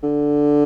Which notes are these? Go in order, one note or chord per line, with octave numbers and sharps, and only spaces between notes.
D3